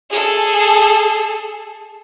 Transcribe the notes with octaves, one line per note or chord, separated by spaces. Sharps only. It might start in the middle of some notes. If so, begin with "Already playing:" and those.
G#4 A4